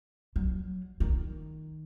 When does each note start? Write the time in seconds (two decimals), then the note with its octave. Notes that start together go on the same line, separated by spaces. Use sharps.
0.36 F#3
1.00 D#3